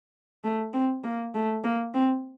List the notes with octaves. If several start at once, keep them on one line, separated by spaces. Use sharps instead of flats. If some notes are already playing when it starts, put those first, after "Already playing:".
A3
C4
A#3
A3
A#3
C4